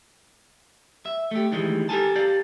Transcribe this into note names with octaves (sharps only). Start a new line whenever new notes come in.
E5
A3 G4
D2 D#3 E3 G3 G#3
G4 A4 A#4 G#5 A5
G4 D5 F5